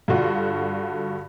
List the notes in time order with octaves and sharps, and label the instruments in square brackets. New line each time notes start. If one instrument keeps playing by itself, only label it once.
[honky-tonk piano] G2 D3 F4 F#4